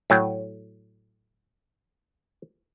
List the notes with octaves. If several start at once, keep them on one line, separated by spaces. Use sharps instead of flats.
A2 F#3 G5